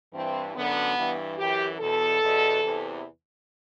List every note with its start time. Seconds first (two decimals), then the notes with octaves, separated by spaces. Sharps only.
0.14 G2 E3 C4
0.56 F#2 D3 B3
0.98 G2 E3
1.38 F#2 E3 G4
1.80 E2 B2 A4
2.22 E2 B2
2.63 E2 C3 E3